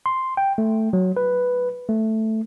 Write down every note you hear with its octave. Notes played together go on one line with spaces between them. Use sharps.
C6
G5
A3
F#3
B4
A3